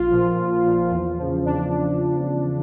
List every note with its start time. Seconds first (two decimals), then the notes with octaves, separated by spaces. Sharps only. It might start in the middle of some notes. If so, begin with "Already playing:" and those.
Already playing: A#1 F4
0.10 A#2 F3
0.37 A#1
0.64 A#2 F3
0.91 E2
1.18 C#3 F3
1.45 E2 D4